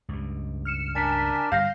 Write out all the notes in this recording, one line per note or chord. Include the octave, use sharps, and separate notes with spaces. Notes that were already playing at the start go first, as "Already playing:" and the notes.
C#2 G2
F6 C#7 E7
D4 A#4 D5 G#5 B6 E7
G1 G3 F5 G6 A#6 C7